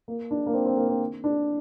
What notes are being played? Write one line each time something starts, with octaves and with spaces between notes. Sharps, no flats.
A#3
D4
A#3
C4
C4
A#3
C4
D4